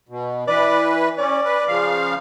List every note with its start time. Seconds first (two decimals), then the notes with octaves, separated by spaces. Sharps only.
0.09 B2
0.48 E3 B4 D5
1.18 C#4 D5
1.45 B4
1.68 C#3 F3 F5